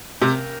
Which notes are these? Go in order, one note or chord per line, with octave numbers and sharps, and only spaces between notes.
C3 A#3 C#4 G4 A#4